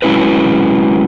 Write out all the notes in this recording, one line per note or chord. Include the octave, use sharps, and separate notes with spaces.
F#3 G#3 C#4 E4 A#4 B4